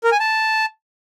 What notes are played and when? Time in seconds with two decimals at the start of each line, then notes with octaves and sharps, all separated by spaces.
0.04 A#4
0.12 G#5
0.20 A5